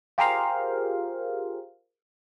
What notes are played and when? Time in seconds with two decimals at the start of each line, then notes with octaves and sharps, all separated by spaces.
0.18 F4 G4 G#4 A#4 C5 F5